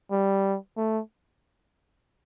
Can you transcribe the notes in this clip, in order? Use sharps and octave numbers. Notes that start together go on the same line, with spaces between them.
G3
A3